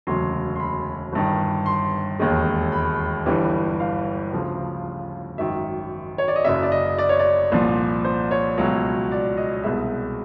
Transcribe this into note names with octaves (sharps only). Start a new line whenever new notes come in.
E1 D2 C#3 F#3 C6
C6
B5
G1 G2 D#3
C6
E1 D#2 D#3 G#3
B5
G1 G2 E3 G3
F5
D2 C#3 F3 A3
G#1 F#2 D#3 E5
C#5
D5
D#5
F#1 F#2 C#3 E5
D5
D#5
D5
C#5
D5
C2 A#2 F3
C5
C#5
C#2 B2 F#3 A3
D5
D#5
D#5
C2 B2 G#3 E5